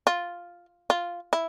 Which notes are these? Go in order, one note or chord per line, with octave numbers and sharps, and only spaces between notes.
F4
F4
E4